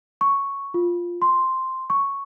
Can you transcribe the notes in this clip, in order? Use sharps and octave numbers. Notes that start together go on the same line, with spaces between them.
C#6
F4
C6
C#6